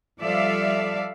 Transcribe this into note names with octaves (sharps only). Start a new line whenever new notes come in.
F3 G3 A4 D5 E5 F5